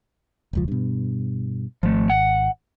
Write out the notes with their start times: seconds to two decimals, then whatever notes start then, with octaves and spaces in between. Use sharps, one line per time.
0.53 E1 C#2 F3
0.68 G2 B2
1.83 G#1 F3 A3
2.10 F#5